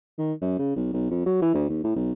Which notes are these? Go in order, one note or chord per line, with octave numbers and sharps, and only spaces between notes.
D#3
F#2
C#3
B1
B1
F2
F#3
E3
D2
D#2
A2
B1